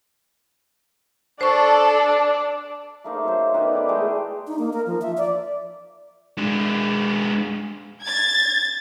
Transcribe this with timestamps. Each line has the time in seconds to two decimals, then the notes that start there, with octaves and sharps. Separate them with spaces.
1.41 D4 A4 C5 D5 C#6
3.04 A3 A#3 D#4 C5
3.24 F#3 A4 C5
3.54 D#3 B3 B4 D5
3.73 E4 D5 D6
3.89 G#3 A3 G#4 G5
4.47 D#4
4.59 A#3
4.73 A#4
4.86 F3
5.02 E5
5.17 D5
6.38 G#3 D4
8.03 G#6 A6